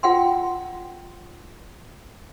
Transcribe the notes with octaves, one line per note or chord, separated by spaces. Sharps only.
F4 F#5 G5 C6